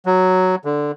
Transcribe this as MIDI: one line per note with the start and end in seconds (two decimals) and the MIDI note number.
0.06 0.55 54
0.65 0.92 50